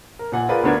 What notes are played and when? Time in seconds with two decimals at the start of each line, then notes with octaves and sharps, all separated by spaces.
0.19 A#4
0.32 A#2 F#5 G#5
0.49 F4 G#4 A#4 B4 D5
0.63 D2 B3 D4 A#4 G#6